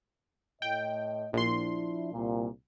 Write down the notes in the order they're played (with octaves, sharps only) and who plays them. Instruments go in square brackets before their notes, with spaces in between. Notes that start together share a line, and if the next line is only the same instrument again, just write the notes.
[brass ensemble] A2 D#5 [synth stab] G5
[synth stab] A#1 C6 [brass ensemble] F3 D4 E4
[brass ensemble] C2 A#2